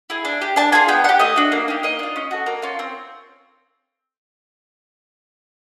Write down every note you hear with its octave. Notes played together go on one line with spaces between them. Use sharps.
E4 G#4
D4
G4
D4 A5
F4 G#4 G#5
B3 G5
D4 F#5
G4
A3 D#5
D4 F#4
A#3
D#4 G4
A#3 D#5
D4 F4
C#4
F#4 A4
A#3
C#4 F4
C4